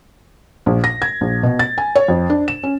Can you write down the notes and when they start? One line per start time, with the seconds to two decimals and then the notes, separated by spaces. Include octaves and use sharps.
0.66 A#1
0.84 A#6
1.02 G#6
1.21 A#1
1.43 B2
1.59 A6
1.78 G#5
1.95 C#5
2.08 F2
2.30 D4
2.48 E7
2.63 C#4